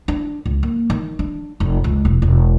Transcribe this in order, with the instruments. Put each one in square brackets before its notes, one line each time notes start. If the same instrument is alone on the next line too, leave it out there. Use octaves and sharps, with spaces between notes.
[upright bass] D4
C#2
A#3
D#3
D4
F1
C#2
E1
E1